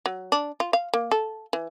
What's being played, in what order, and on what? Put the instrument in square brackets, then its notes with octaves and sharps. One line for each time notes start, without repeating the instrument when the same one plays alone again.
[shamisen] F#3
D4
F4
F5
A#3
A4
E3